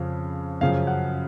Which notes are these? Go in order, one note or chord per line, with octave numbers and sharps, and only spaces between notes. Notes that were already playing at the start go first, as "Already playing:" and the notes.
Already playing: F2 C#3 F3
F#2 C#3 F3 F5
F#5